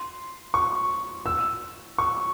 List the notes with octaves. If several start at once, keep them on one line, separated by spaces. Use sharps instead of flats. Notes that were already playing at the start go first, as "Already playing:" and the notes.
Already playing: C6
C#6
E6
C#6